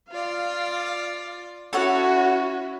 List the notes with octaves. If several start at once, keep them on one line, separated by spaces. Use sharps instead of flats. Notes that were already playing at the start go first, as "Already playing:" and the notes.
F4 D5 F5
C#4 E4 F#4 A4 C#5 F#5